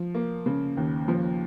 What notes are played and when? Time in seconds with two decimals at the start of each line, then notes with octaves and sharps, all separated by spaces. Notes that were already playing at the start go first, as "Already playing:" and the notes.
Already playing: F3
0.14 A#3
0.46 C#3
0.77 D#2
1.08 F3